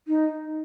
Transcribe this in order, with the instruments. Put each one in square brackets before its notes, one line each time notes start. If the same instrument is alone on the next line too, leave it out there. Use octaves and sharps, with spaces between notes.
[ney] D#4